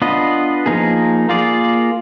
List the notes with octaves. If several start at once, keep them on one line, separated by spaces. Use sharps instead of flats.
B3 D4 F4 B4 D#5
F3 A#3 D#4 G#4
A#3 F4 G#4 D5